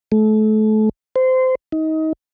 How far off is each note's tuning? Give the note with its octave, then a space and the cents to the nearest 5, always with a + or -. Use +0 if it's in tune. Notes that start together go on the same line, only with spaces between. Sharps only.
A3 -30
C5 -20
D#4 +25